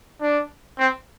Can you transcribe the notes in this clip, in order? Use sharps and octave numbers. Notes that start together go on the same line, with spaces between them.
D4
C4